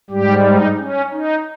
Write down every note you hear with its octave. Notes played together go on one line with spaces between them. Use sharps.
G#2 G3 G4
D#4
C#4
D#4